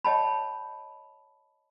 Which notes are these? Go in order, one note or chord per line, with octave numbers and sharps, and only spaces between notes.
C#5 D#5 G5 A5 B5